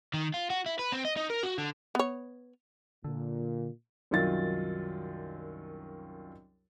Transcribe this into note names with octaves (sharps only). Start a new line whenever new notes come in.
D#3
F4
F#4
E4
B4
C4
D#5
D#4
A#4
F#4
D3
B3 C#5
A#2 D3
C2 F#2 D#3 F#3 F4 A6